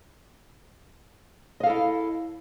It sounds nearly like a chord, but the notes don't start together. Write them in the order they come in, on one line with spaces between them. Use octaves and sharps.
D#5 F5 A4 E4